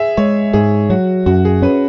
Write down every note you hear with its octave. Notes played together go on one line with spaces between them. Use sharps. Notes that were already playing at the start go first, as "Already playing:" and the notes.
Already playing: G#4 E5
G#3 C#5
G#2 G#4
F#3 F#4
F#2 F#4
G#4
C#4 B4